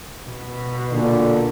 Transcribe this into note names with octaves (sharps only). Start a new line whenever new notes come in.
B2
A#2 D3